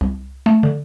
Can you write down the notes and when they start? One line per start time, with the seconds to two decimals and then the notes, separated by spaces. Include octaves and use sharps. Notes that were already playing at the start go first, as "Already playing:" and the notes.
0.01 C2
0.46 A3
0.63 D3